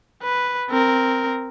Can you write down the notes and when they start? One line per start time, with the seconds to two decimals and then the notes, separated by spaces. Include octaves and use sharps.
0.23 B4
0.70 C4 A#4